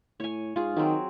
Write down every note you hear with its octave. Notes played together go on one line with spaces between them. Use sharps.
A2 C#5 G#5
G#2 F4 G#4
D#3 F#3 C4